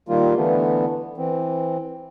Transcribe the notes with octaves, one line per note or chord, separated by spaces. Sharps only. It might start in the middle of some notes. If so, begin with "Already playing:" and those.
D#3 G3 A#3 F4
D3 E3 A3 B3
E3 C4